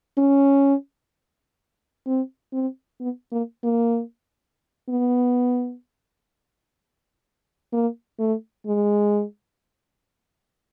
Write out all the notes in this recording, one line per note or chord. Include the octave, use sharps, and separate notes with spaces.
C#4
C4
C4
B3
A#3
A#3
B3
A#3
A3
G#3